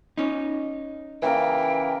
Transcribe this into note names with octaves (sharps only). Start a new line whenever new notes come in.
C#4 D#4
C#3 E3 A#3 A#4 G5